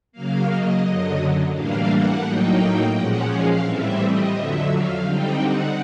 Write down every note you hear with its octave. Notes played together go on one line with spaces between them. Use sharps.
C#3 F#3 A#3 F5
D#5
F#2 D3 F#3
A2 E3 G3 A#3 D4 F5
F#5
A2 F#3 A#3 D#4 G5
A#2 F3 G#3 C#4 F#5
F5
A2 E3 G3 C4 E5
D#5
F2 D3 F#3 E5
F5
D3 G3 C4 D#4 G5
F#5